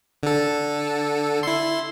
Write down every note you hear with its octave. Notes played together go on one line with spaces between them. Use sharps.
D3 A4
E4 C6